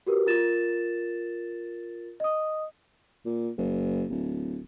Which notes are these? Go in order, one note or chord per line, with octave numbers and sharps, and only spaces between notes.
F#4 G4 A#4 B4
F4 A#4 A6 E7
D#5 D#6
A#2
F#1
D1